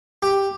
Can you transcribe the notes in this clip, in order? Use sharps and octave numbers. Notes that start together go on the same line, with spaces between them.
G4